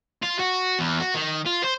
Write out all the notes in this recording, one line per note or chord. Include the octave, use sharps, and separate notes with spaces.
F4
F#4
E2
F#4
D#3
F4
C5